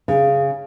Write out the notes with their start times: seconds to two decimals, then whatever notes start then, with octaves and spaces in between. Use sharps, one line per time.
0.08 C#3